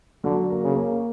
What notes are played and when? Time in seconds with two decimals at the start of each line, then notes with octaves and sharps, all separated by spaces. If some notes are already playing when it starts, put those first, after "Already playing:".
0.24 D3 F#3
0.50 A#3
0.63 C#3
0.75 A#3